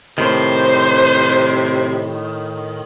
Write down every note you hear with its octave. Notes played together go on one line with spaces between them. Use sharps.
A2 C3 D#3 C5